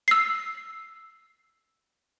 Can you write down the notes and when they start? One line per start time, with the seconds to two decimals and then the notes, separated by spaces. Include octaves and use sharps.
0.08 E6 C7